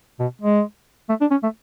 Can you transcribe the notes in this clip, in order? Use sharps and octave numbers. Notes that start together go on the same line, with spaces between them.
B2
G#3
A3
D4
C#4
A3